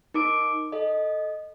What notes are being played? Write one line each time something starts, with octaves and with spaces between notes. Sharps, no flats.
D#4 A#4 D6 D7
A4 D#5